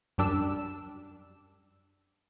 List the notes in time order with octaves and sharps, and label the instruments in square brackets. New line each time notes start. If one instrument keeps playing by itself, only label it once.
[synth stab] F#2 G3 D4 E6